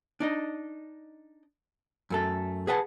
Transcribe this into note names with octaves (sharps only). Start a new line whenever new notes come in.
D4 D#4 D#5
F#2 A3 A4
G#4 B4 F#5 G#5 A5